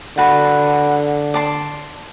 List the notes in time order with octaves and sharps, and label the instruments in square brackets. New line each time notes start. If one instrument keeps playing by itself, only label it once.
[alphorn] D3 [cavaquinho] F#4 B4 A5
[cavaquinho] D5 A5 C6